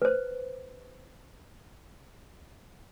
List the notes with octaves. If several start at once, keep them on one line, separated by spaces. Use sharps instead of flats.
B4 C5